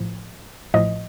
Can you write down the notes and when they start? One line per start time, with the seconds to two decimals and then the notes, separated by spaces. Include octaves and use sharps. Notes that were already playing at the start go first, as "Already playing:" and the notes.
Already playing: A1 A2 F3
0.74 A1 A2 F3 D#5